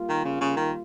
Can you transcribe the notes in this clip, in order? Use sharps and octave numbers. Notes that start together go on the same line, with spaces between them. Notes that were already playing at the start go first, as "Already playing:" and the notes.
Already playing: G3 A#3 F4
D#3
C#3
C#3
D#3